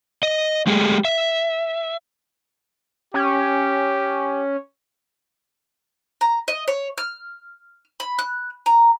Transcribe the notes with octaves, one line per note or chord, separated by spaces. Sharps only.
D#5
G#3 A3 G4 G#4
E5
C#4 G4
A#5
D#5
C#5
F6
B5
F#6
A#5